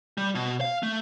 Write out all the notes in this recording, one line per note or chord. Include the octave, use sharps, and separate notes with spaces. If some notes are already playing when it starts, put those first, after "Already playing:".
G3
B2
F5
A3